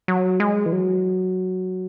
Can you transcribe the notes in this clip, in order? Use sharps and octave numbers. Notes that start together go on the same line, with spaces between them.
F#3
G#3
E3
F#3